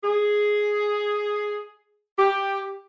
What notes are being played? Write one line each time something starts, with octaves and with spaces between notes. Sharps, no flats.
G#4
G4